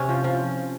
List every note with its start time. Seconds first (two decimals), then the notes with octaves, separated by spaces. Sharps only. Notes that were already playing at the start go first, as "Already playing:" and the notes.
Already playing: C3 C#4
0.09 F3
0.24 F3